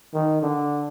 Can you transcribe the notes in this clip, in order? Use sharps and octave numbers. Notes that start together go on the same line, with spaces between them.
D#3
D3